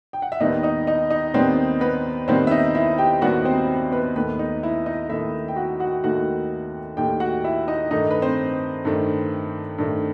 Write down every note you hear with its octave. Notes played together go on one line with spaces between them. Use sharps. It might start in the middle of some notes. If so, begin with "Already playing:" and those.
G5
F#5
E5
D#2 D#3 G3 B3 D#4 D#5
D#4 D#5
D#4 D#5
D#4 D#5
D#2 D#3 G3 B3 C4 C5
B3 B4
D#2 D#3 G3 B3 C4 C5
E5
D#4 D#5
E4 E5
G4 G5
D#2 D#3 G3 B3 F#4 F#5
C4 C5
B3 B4
D#2 D#3 A3 B3 B4
D#4
E4
D#4 D#5
D#2 D#3 A3 E4 E5
G5
F#4 F#5
F#4 F#5
D#2 D#3 A3 F#4 F#5
D#2 D#3 A3 G4 G5
F#4 F#5
E4 E5
D#4 D#5
G2 D#3 A3 D#4 D#5
B4
C4 C5
G2 D#3 A3
G2 D#3 A3